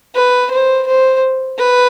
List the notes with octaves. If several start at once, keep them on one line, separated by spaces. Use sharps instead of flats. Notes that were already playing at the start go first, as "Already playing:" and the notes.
B4
C5
C5
B4